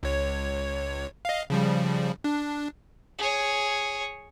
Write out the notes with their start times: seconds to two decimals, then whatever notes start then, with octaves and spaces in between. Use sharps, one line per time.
0.03 C#2 C#5
1.25 D#5 F5
1.50 C#3 F3 G3
2.24 D4
3.18 G#4 C#5